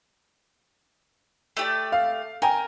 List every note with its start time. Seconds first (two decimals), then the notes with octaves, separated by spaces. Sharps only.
1.57 A3 G4 D5
1.92 F5
2.42 A#4 G5 G#5